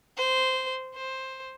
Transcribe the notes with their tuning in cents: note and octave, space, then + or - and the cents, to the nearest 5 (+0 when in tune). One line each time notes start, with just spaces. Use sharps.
C5 -10
C5 +5